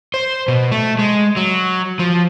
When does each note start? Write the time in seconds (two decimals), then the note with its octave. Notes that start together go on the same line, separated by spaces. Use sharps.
0.14 C5
0.48 B2
0.72 A3
0.99 G#3
1.37 F#3
1.99 F3